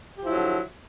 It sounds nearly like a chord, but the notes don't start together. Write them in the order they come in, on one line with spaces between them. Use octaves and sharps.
G4 F3 E4 F#3 D3